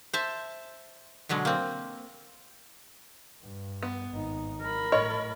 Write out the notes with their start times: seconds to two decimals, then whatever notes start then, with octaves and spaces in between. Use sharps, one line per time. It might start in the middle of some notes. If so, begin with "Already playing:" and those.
0.13 C5 E5 A5
1.29 B2 D3 F#3 G#3
1.45 A#3 C4
3.42 G2
3.83 B3
4.11 G#1 D#4
4.61 A#4 B5
4.92 A2 C#5 D#5